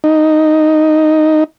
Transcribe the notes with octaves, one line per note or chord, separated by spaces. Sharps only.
D#4